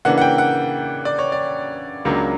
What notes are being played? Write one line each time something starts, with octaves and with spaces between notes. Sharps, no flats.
C#3 E3 A#3 D4 F#5
F#5
G5
F#5
D5
C#5
D5
C#2 C#3 F#3 A#3 D4